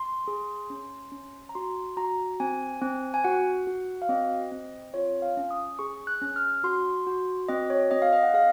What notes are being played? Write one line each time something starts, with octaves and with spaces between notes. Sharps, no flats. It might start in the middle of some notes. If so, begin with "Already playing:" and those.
Already playing: C6
G#4
C#4
C#4
A#5
F#4 C6
F#4 A#5
C4 G#5
C4
G#5
F#4 F#5
F#4
F5
C4 D#5
C4
F4 C#5
F5
C#4
D#6
G#4 C#6
F#6
C#4
F6
F#4 C6
F#4
C4 D#5
C#5
C4 D#5
F5
D#5
F#5
G#4 F5